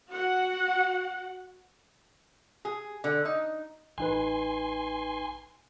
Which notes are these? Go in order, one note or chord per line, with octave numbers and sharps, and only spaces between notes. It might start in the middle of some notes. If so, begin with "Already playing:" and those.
F#4 F#5
G#4
D3
D#4
A1 D#4 B4 G#5 C6